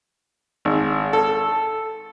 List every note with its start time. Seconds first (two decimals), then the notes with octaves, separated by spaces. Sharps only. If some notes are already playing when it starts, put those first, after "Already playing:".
0.65 G#1
1.13 A4